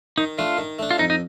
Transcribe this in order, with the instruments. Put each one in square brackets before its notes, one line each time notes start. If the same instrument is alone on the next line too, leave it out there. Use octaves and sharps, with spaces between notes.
[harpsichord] D#3 [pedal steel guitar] D#4
[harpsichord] A3 D4 [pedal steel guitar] F4
[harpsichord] D#3
A3 D4
[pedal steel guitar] F4
[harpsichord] F2 [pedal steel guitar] D#4
[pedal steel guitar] D#4